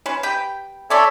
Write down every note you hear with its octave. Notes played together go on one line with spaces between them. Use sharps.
C#4 B4 C5
G4 B4 G5
C#4 A4 C#5 D5 E5 C6